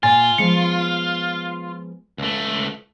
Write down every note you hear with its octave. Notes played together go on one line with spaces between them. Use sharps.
A#2 F4 C#5 F#5 G#5 A6
F3 G#3 B3 C#7
C#2 A3